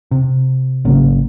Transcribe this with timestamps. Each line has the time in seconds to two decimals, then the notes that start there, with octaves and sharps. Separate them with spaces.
0.11 C3
0.85 G#1 C#3 F#3 A#3